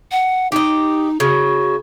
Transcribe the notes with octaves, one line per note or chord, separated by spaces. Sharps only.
F#5
D#4 G4 D#5
C#3 F#4